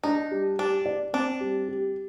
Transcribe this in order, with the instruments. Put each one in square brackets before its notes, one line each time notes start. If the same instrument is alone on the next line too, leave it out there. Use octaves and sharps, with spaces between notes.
[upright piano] D4 [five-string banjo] D#4
[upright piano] G3
[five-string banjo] D4 [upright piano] G4
[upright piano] D5
[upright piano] C4 [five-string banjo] D4
[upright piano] G3
G4